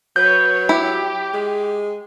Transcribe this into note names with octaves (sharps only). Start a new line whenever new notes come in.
F#3 B4 C#5 G6
E4 G4
G#3